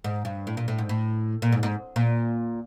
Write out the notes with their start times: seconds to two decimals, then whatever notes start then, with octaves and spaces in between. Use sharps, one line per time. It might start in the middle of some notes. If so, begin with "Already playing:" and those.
0.04 G#2
0.25 G2
0.47 A2
0.57 A#2
0.68 A2
0.78 G#2
0.89 A2
1.42 A#2
1.52 G#2
1.63 G#2
1.96 A#2